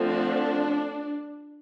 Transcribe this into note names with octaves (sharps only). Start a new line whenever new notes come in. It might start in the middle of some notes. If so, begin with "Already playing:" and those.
Already playing: D3 F3 A3 C4
D4